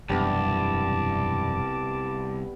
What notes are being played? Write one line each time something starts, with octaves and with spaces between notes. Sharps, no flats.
E1 C2 F#2 G3 B3 D4 A5 D6